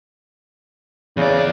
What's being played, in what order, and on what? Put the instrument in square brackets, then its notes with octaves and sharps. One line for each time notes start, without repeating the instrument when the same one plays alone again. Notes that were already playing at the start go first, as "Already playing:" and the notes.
[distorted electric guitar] E2 D5 [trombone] C#3